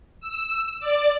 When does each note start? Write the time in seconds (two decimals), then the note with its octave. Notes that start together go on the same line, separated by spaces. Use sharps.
0.21 E6
0.80 D5